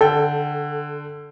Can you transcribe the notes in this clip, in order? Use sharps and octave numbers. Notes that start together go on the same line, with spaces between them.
D3 A4 G5